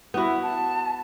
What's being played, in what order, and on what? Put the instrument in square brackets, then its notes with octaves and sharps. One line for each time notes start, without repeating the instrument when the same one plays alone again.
[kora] B3 F#4 [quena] E4
[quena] A5